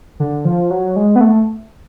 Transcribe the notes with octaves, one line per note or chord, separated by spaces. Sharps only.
D3
F3
F#3
G#3
B3
A3